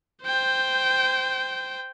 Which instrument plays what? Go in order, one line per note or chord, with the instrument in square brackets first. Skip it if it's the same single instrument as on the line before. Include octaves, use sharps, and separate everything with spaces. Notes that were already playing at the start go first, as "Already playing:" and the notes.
[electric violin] C5 G5